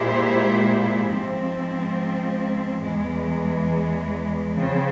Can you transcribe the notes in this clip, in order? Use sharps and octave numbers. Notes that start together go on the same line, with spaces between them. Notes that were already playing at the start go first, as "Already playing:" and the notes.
Already playing: A#2 G#3 E4 G4 C5
G#2 F3 C4
E2 E3 G#3
C#3 F3 C4